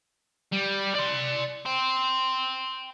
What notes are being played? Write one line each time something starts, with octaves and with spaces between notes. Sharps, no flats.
G3
D5 C6
G5 C6